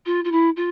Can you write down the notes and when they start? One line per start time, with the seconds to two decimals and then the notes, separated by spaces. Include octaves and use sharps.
0.06 F4
0.24 F4
0.31 E4
0.56 F4